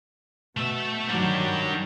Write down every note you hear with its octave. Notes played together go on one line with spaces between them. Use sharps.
B2 A3 E5
D#3 F#3 G3 D4